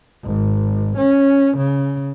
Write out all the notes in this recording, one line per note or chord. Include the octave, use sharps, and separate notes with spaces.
G#1
C#4
C#3